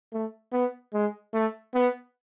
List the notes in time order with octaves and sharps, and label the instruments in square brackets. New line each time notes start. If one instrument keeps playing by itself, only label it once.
[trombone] A3
B3
G#3
A3
B3